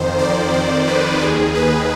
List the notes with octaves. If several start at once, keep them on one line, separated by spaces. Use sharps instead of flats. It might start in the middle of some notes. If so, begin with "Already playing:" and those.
Already playing: F2 D#3 C5
D5
C5
B4
D#2 D#3 G#4
B4